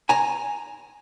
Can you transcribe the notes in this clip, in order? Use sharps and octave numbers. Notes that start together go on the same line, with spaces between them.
G#5 A#5